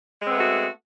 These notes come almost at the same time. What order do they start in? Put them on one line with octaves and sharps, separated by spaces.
G#3 C4 B3 A3 F#4